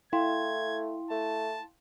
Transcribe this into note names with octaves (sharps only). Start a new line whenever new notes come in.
A3 E4 F5 G5 C6 G#6
A3 A5